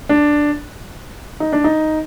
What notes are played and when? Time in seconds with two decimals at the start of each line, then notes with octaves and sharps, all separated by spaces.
0.09 D4
1.40 D#4
1.53 D4
1.64 D#4